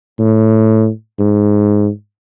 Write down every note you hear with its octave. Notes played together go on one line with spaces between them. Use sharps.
A2
G#2